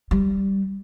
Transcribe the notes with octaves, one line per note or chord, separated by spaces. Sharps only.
G3